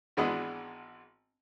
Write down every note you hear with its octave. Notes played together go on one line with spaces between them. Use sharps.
G#1 E3 G#3 B3 D4 D#5